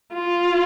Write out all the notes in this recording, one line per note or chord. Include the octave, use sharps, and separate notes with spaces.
F4